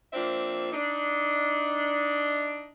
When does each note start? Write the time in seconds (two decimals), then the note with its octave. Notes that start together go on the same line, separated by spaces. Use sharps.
0.13 F3 A#3 C4 D4 E5
0.72 D4 D#4